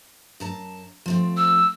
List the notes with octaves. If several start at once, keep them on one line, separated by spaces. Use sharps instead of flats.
F#2 A5 A#5
F3 A3 C4
E6